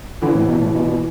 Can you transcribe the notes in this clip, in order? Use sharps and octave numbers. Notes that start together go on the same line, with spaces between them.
D3 E3
A2
B2
A2
B2
B2